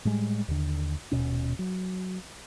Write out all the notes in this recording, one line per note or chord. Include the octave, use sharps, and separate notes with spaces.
A2 G3 G#3
D#2 D3
D#1 G#1 B2 C#4
F#3